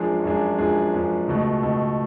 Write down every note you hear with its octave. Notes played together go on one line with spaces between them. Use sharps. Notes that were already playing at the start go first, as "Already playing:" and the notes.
Already playing: F#2 F3 G#3 D4 G#4
F#2 F3 G#3 D4 G#4
F#2 F3 G#3 D4 G#4
F#2 F3 G#3 D4 G#4
C#2 B2 A3
C#2 B2 A3